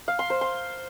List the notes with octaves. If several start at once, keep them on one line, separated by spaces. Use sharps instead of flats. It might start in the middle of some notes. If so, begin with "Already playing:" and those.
F5
C6
C5
C6